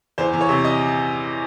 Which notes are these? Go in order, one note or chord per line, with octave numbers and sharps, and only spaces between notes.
E2 C5
E2
C#5
C3
D#5